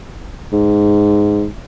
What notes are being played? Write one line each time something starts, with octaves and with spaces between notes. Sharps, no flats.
G#2